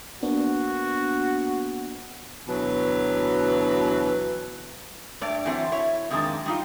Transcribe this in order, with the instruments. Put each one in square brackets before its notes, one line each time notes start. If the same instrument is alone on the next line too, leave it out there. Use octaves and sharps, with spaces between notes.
[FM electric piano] A#3 B3 D4 [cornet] F#4
[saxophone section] D2 B2 E3 F#3 B4
[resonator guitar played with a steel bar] G2 A3 C#5 D5
E3 F#3 A3 C4
E4 C#5
F2 D#3 G#3 A#3 D4 A5
G3 D#4 F4